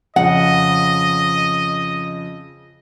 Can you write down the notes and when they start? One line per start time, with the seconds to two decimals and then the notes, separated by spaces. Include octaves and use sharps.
0.16 F2 C#3 D#5 F#5